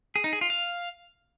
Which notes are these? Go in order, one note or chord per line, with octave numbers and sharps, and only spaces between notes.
G#4
D#4
G#4
F4
F5